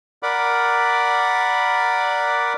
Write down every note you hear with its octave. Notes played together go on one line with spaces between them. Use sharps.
A#4 D5 F#5 B5 D6